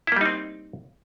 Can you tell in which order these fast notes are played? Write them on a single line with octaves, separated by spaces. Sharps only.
E4 A#3 G3 D#4 C4